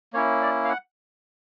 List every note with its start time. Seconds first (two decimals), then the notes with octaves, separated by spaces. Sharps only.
0.13 A#3 C#4 E4 C#5
0.42 D5
0.65 F5
0.69 F#5